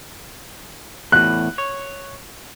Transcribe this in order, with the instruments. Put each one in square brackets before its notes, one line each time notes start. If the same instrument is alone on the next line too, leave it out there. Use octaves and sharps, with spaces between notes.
[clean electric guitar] E2 A2 [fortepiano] F#6
[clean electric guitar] C#5